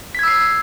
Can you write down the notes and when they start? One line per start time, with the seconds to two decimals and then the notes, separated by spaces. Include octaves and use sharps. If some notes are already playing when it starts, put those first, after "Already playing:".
0.15 B6
0.19 G#6
0.23 E6
0.28 C7